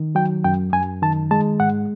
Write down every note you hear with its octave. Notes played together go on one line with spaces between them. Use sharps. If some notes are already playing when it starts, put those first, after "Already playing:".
Already playing: D#3
F#3 G5
F#2 G5
F#2 G#5
D#3 A5
G#3 A5
G#2 F#5